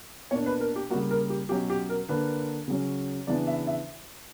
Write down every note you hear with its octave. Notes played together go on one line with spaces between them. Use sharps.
B2 A#3 D4 C#5
B4
A#4
G4
C#3 G3 A#3 F#4
A#4
G4
B2 F#3 C#4 G4
G4
A#4
D3 A#3 D4 B4
C#3 F#3 C#4
C#3 E3 B3 D4 D5
E5
E5